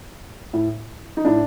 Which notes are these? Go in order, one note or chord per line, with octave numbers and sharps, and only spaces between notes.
A2
D#4
A2 D4